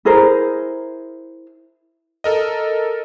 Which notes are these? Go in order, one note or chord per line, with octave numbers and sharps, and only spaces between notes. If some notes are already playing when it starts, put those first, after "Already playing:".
E4 G#4 A#4 C5
A4 A#4 D#5